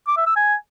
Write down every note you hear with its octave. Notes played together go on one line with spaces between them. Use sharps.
D6
E5
E6
G#5